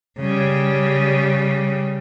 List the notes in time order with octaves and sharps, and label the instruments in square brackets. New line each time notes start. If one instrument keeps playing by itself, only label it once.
[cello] C#3 G3